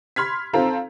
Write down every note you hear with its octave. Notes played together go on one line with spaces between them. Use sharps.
B5 C6 F6 G#6 B6
C4 F4 A4 F5 A#5